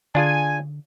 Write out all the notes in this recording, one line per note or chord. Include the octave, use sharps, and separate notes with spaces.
D3 D4 F4 G#4 G#5